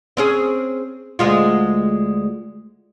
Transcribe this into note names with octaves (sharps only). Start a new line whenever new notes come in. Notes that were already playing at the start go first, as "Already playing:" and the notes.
C4 C#4 G#4
D2 G#3 F4